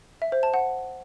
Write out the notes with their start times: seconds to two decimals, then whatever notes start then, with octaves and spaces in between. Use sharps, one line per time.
0.22 E5
0.32 C5
0.43 A5
0.54 F#5